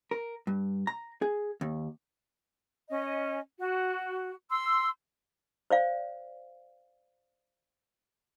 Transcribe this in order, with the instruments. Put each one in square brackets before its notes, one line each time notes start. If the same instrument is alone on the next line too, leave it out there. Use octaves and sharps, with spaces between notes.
[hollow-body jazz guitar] A#4
G2
A#5
G#4
D#2
[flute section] C#4 D#5
F#4
C6 E6
[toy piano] C5 D5 F5